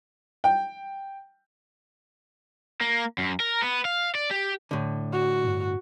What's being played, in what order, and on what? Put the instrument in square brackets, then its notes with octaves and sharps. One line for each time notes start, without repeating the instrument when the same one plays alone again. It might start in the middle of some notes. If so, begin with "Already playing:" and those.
[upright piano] G5
[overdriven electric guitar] A#3
F#2
A#4
B3
F5
D5
G4
[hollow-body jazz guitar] A2 D3
[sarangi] F#4
[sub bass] G2